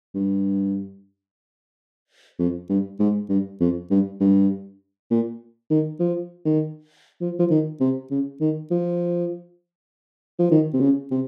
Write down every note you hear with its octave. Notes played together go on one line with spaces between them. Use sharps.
G2
F2
G2
G#2
G2
F2
G2
G2
A#2
D#3
F3
D#3
F3
F3
D#3
C3
C#3
D#3
F3
F3
D#3
C3
C#3
C3